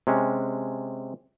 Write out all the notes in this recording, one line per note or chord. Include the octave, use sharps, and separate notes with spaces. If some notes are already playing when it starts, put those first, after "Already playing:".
C3 G#3 C#4